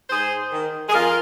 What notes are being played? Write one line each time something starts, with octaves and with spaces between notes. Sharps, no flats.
G#2 G#4 C5
D#3
G#4
F2 F4 A#4